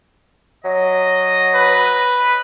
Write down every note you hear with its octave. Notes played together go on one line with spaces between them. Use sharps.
F#3 D#5
B4